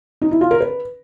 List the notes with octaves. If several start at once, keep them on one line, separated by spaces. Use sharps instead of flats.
D#4
E4
F4
A#4
B4